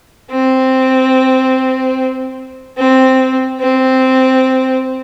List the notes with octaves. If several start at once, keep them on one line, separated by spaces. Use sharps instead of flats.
C4
C4
C4